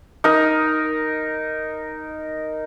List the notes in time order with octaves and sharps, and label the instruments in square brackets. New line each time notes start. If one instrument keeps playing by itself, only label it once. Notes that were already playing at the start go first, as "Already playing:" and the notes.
[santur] D#4 A#4